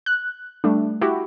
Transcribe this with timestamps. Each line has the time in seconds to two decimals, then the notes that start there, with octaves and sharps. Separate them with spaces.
0.06 F#6
0.64 G3 A3 D4
1.01 E4 F#4 G4